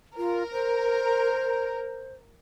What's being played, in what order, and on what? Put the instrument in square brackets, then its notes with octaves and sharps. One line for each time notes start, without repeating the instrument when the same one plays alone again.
[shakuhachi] F4 [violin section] A#4
[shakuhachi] C5